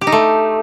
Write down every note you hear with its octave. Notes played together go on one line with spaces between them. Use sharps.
G4
D#4
A3